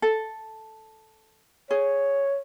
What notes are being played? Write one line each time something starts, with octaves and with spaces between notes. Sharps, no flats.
A4
G#4 C#5